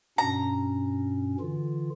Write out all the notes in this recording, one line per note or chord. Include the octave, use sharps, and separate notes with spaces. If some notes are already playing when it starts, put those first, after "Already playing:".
G2 B2 C#4 A#5
D3 E3 F4